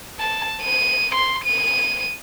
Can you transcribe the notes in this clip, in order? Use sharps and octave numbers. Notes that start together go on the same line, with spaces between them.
A5
D#7
C6
D#7